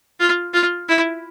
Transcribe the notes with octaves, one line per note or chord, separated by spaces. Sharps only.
F4
F4
E4